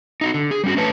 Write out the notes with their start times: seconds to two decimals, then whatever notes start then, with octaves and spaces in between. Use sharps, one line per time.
0.21 D#4 F4 F#4
0.34 D3
0.51 G#4
0.64 G3 C#4 F#4
0.77 A3 D4 B4 C#5 A5